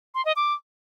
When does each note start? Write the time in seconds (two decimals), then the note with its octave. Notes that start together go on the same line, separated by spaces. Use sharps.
0.14 C6
0.25 D#5
0.36 D6